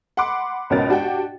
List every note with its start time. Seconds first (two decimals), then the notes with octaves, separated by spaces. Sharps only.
0.17 F#5 B5 C6 D6
0.70 C#2 G#2 B2 C#4 A#4 A6
0.89 D4 F#4 G4 G5